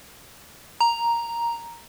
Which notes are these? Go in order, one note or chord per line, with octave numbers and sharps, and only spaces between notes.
A#5